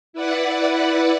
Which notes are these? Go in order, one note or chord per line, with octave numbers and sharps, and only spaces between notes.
E4 B4 D5 F#5